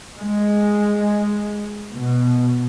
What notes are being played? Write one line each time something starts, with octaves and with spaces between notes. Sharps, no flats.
G#3
B2